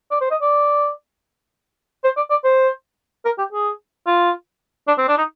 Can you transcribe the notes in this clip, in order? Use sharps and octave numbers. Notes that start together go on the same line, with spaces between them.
D5
C5
D#5
D5
C5
D5
D5
C5
A#4
G4
G#4
F4
D4
C4
D4
D#4